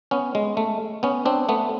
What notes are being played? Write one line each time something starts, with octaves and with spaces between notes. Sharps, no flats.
B3 C#4
G#3
A3
B3 C#4
C4 D4
A3 B3